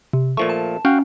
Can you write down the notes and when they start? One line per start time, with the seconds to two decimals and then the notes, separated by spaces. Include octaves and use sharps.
0.13 C3
0.37 A#2 F3 A3 C#6
0.50 A5
0.85 C#4 F#4 F5 G5